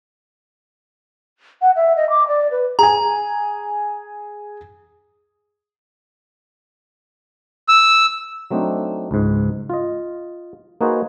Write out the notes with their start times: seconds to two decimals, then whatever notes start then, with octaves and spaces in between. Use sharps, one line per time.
1.62 F#5
1.76 E5
1.96 D#5
2.10 D6
2.28 D5
2.51 B4
2.79 G#4 G#5 A#5
7.68 E6
8.51 F#3 A3 C4 D4 D#4
9.11 C#2 G#2
9.70 F4 D#5
10.81 A#3 D#4 F#4 G#4 B4 C5